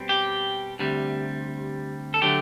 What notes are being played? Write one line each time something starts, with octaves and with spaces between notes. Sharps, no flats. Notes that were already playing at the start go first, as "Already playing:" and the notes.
Already playing: B2 G3 C4
G4
D2 C3 G3
A4
D3 F#3 A3 G4